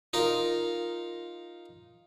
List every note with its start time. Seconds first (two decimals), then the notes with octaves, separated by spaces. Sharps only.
0.13 D#4 F4 A#4